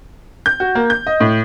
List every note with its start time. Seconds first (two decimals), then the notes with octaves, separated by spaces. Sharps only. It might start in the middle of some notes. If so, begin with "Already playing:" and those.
0.46 G6
0.60 F#4
0.75 A#3
0.90 G6
1.07 D#5
1.20 A2